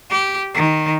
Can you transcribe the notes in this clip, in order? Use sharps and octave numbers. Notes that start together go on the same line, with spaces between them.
G4
D#3